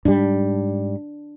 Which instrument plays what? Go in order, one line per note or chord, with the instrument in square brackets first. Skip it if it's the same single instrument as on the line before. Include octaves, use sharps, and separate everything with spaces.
[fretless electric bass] G#2 G3 [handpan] D4